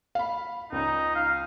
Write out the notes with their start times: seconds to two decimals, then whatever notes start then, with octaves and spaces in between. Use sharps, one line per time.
0.15 F5 B5
0.72 C#2 D#4
1.15 F5